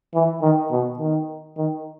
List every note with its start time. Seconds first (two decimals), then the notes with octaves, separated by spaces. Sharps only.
0.14 E3
0.42 D#3
0.71 B2
0.99 D#3
1.57 D#3